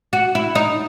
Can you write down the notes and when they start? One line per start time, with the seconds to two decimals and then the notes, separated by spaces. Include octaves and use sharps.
0.13 F#4
0.35 E4
0.55 D#4